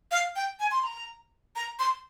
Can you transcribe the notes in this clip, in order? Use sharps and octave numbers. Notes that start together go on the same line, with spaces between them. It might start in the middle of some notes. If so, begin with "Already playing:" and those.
F5
G5
G#5
C6
A#5
A#5
C6